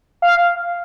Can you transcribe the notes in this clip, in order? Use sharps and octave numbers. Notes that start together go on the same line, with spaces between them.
F5